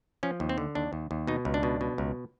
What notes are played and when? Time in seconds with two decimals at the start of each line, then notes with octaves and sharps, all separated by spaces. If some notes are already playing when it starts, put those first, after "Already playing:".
0.23 F3 C#4
0.40 D#2
0.49 C4
0.58 D3
0.75 D#2 D4
0.93 D#2
1.11 D#2
1.27 B2 D#4
1.45 C#2
1.54 D4
1.63 B2
1.81 B2
1.98 C#2